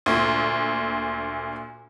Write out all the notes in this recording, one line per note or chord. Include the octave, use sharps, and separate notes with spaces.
D2 A#2